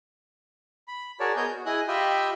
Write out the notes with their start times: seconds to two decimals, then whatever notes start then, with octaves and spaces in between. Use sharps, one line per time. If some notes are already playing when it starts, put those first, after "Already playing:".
0.88 B5
1.20 F#4 G#4 A#4 C#5 D5 A5
1.37 B3 G#4 A#4 C#5 D#5 G6
1.49 F#4
1.66 E4 G#4 D#5 G#5 D#6 F#6
1.88 F4 G4 D#5 E5 G5 B5